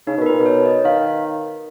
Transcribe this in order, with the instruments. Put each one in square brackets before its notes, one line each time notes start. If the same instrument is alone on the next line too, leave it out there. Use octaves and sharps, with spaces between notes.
[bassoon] C#3 [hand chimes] D#4
[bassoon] B2 [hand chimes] A#4
[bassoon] A#2 [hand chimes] B4
[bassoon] B2
[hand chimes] C#5
D#5
[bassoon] D#3 [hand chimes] F5